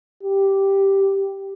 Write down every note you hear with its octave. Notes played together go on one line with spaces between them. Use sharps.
G4